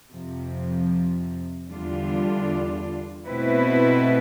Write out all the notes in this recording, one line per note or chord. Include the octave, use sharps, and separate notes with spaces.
F2 C3 F3
E2 D3 G3 D4 F4
B2 A3 C4 E4 B4